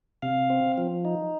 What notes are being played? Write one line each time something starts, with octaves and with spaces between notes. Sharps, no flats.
C3 F5
C4
F3
D#4